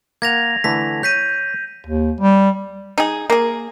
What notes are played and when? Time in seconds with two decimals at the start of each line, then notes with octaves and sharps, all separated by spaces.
0.22 A#3 F#5 G#6 A#6 F7
0.64 D3 E3 A3 B6
1.03 C#5 G6 B6 D#7
1.87 D#2
2.20 G3
2.98 D#4 G#4
3.30 A#3 G#4